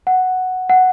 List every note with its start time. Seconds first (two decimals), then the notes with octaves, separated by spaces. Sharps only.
0.07 F#5
0.69 F#5